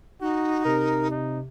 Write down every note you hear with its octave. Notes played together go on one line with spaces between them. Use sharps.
D#4 F#4
C3 A#4
D#4